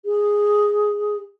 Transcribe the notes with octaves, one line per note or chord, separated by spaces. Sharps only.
G#4